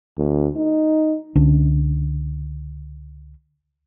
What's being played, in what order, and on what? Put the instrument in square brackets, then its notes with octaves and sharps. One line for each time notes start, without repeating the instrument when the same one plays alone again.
[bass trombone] D2
D#4
[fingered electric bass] C#2 D3 C#4 D4